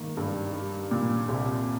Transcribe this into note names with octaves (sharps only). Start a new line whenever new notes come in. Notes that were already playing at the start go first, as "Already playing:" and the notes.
Already playing: D#3 A#3
G2
G3
A#2
C2